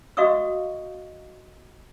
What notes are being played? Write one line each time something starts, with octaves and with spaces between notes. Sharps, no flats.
F#4 D#5 F5 C#6 D#6 E6